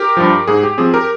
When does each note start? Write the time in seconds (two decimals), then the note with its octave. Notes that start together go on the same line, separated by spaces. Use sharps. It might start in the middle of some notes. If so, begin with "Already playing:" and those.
Already playing: G4 A#4
0.17 G2 F3
0.48 G#2 G#4
0.63 G4
0.78 F3 C4 G#4
0.94 G4 A#4